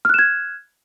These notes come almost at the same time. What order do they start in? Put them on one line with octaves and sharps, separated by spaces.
F6 F#6 E7 G#6